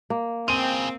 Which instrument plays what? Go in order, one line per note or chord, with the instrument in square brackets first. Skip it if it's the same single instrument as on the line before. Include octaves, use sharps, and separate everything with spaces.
[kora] A#3
[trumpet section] C4 [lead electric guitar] F4 G#4 [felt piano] D#7